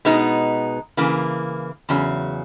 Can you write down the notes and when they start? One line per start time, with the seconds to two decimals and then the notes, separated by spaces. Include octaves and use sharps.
0.05 B2 G#3 B3 D#4
0.97 C#3 E3 A#3
1.89 E2 C#3 F#3